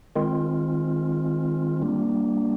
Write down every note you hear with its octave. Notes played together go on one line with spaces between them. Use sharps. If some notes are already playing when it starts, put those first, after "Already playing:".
D#3 G#3 C4 F4
G3 A#3 D4